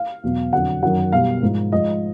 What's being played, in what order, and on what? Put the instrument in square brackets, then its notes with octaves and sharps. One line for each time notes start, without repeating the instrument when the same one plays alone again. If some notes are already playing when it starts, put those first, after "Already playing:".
Already playing: [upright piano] F5
E2 B2 F#3
F2 D3 F#3 F#5
F#2 D#3 F#3 F#5
B2 G3 F5
G#2 F3
G#2 F3 D#5